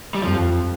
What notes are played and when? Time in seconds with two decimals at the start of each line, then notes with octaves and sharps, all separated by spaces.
0.15 G3
0.22 F2 F3